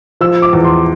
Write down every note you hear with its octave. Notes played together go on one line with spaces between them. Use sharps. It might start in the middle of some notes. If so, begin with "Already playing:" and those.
F3 E6
D6
E2
C6